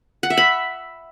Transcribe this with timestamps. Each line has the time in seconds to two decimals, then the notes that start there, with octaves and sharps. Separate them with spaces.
0.23 F#5
0.30 E5
0.37 B5